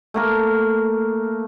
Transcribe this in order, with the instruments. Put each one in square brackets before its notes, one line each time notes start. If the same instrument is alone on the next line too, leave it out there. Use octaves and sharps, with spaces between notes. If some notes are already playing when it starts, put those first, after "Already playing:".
[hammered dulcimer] A3 A#3 A#4